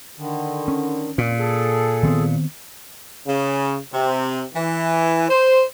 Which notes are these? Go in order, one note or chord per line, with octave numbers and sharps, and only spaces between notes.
D3 D#3
C#4
F2 A#2
G#4 A4
D#3 B3 C4
C#3
C3
E3
C5